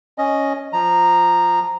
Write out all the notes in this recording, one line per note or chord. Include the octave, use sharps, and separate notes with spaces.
C#4 D#5
F3 A#5